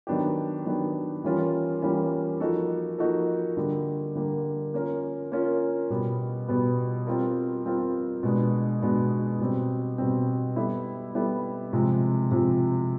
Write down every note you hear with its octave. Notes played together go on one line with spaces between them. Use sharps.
D#3 F#3 B3 D4 G4
D#3 F#3 B3 D4 G4
E3 G3 A#3 C#4 F4
E3 G3 A#3 C#4 F4
F3 A#3 D#4 F#4 A4
F3 A#3 D#4 F#4 A4
D3 G3 A#3
D3 G3 A#3
A#3 C#4 F4 A#4
A#3 C#4 F4 A#4
B2 G3 B3
B2 G3 B3
G3 C4 F4 A#4
G3 C4 F4 A#4
B2 G#3 B3 D4
B2 G#3 B3 D4
B2 G3 C4
B2 G3 C4
G3 B3 E4 A4
G3 B3 E4 A4
C3 F3 G#3 C4
C3 F3 G#3 C4